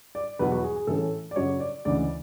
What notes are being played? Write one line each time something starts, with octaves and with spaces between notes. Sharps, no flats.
D5
E2 B2 F#3 B4
F#4
G#4
G#4
A2 E3 A3 C#4 A4
D5
F#2 C#3 F#3 C#5
D5
D2 C#3 E3 G#3 D5